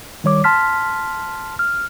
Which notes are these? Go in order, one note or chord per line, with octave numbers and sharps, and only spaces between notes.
D#3 G3 C#5 D6
A5 C6 F6 B6
F6